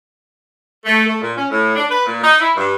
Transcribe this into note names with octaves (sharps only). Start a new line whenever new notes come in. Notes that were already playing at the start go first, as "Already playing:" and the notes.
A3
A3
A#2
C#4
A2
D4
B4
A#2
D#4
E4
G2